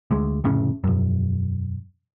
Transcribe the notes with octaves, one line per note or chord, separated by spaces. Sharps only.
D2 G#3
F1 A2 C#3 C#4
E1 F#2